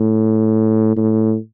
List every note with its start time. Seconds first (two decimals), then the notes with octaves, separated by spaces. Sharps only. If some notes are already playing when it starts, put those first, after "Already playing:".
Already playing: A2
0.97 A2